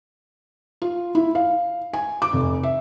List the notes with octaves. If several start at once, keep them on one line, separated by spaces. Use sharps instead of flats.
F4
E4
F5
G#5
D6
F1
E5